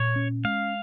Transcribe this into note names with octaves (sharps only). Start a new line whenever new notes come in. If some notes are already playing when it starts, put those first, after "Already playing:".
Already playing: A#2 C#5
C#4
G#3 F5